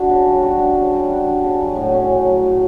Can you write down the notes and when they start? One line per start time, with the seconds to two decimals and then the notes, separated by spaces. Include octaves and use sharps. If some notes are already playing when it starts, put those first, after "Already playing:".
Already playing: D4 F#4
0.09 C#3
0.26 G3
0.42 F#4
0.59 D4
0.76 C#3
0.93 G3
1.10 F#4
1.27 D4
1.44 C#3
1.61 F#3
1.76 A2
1.94 C#4
2.10 A2
2.27 F#3
2.44 A2